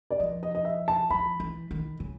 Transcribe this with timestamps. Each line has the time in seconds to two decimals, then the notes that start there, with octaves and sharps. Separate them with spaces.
0.10 D5
0.20 F3 D#5
0.43 D#5
0.55 D#5
0.65 E5
0.88 A5
1.10 F3 B5
1.40 E3
1.71 D#3
2.00 C#3